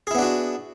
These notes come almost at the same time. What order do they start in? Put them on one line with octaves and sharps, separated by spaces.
G#4 E4 B3 D4 F#4